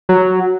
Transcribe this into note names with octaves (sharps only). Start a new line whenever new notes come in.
F#3